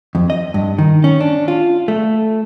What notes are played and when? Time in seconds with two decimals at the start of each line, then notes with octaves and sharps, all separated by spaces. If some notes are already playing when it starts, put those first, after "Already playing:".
0.15 F2
0.30 D#5
0.54 G2
0.78 D#3
1.04 C#4
1.20 D4
1.48 F4
1.88 A3